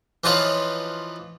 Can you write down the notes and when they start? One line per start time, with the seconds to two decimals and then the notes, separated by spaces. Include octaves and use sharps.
0.24 E3 F3 D#4 F4 B4 C#5